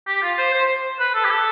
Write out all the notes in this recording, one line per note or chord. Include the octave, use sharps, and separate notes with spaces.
G4
F4
C5
C5
B4
A4
G4
A4